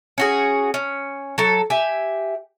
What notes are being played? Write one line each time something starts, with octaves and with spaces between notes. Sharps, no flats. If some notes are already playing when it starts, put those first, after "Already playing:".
C#4 F#4 G#4
C#4
F#3 A4
G4 E5 G#5